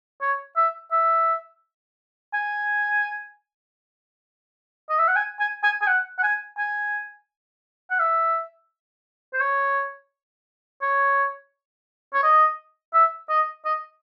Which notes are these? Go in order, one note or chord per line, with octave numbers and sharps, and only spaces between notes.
C#5
E5
E5
G#5
D#5
E5
F#5
G#5
G#5
G#5
G#5
F#5
F#5
G#5
G#5
F#5
E5
C5
C#5
C#5
C#5
D#5
E5
D#5
D#5